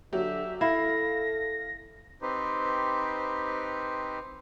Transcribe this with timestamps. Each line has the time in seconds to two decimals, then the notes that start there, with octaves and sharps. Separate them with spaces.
0.13 D3 F#3 G4 E5
0.61 E4 A4 F5 A#6
2.22 C4 D#4 G4 B4 C5